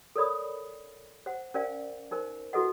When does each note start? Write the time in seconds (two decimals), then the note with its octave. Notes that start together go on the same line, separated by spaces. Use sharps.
0.16 A4 A#4 C#5 D5 B5 D#6
1.26 C5 F#5
1.54 C#4 A#4 C5 D5 F5 G#5
2.11 D#4 A#4 C5 G#5
2.53 E4 F#4 A4 B4 D#5 F#5